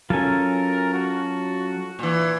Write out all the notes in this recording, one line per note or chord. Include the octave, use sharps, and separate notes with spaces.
F#3 C#4 F4 A4 A#4 G#5
F#4
A#2 E3